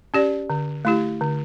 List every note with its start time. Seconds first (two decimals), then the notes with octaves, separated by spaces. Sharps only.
0.14 C#4 G4 D5
0.50 D3
0.85 A3 E4 G4
1.21 D3